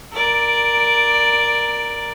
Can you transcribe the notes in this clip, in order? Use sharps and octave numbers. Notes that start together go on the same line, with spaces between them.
A#4 D5